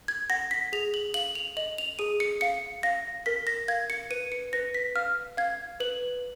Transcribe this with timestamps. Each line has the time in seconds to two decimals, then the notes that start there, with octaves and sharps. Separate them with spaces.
0.08 G#6
0.30 F#5 A#6
0.51 B6
0.73 G#4 F7
0.94 F#7
1.14 F5 F#7
1.35 F7
1.57 D#5 F#7
1.78 F7
1.99 G#4 D#7
2.20 C#7
2.41 F5 C#7
2.83 F5 A#6
3.26 A#4 B6
3.47 A#6
3.68 F5 G#6
3.90 C#7
4.11 B4 D#7
4.32 C#7
4.53 B4 A#6
4.74 B6
4.95 F5 F6
5.37 F5 G#6
5.80 B4 F#7